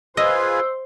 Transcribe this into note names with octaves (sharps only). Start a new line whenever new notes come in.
F4 G#4 B4 C5 D#5 E6